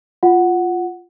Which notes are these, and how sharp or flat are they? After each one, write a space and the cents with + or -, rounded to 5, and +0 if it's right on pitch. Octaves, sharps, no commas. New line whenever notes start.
F4 +0 F#5 +0